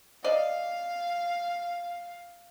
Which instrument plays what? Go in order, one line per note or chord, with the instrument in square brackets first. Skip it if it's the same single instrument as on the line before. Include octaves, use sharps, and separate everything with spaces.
[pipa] D5 D#5 [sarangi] F5